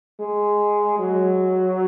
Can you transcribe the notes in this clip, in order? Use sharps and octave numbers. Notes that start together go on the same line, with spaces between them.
G#3
F#3